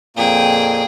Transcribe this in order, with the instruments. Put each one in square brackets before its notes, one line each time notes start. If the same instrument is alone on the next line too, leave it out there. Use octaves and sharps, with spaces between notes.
[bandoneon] F2 A#2 A#3 [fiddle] G#4 G5